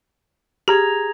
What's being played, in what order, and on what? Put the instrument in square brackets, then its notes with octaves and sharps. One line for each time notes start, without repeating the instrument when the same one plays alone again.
[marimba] G4 [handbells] G#4 A#5 G#6